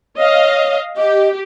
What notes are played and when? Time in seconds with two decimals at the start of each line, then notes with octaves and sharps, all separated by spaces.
0.17 C#5 D#5 F5
0.97 G4 D#5